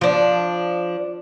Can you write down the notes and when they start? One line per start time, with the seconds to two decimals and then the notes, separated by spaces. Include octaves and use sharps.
0.01 F3 D4